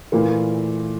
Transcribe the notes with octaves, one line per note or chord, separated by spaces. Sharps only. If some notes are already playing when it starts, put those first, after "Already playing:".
A#2 E3 A3 A#3 E4